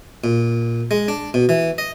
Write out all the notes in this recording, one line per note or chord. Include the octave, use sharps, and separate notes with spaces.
A#2
G#3
D4
B2
E3
D#5